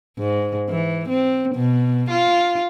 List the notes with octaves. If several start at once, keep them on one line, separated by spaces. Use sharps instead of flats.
G#2
E3
C4
B2
F4